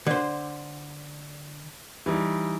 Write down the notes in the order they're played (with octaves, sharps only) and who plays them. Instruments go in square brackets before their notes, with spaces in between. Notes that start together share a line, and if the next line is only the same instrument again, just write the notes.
[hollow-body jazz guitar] D3 C5
[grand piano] E3 G3 D#4